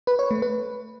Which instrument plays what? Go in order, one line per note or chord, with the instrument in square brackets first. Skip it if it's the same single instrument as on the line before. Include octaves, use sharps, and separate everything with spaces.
[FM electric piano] B4
C#5
A3
B4